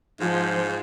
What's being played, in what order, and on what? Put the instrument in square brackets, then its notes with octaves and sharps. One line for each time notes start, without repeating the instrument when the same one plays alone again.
[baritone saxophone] G#2 [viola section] F3